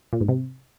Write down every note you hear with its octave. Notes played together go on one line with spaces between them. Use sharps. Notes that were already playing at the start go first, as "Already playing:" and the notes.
A#2
G#2
C3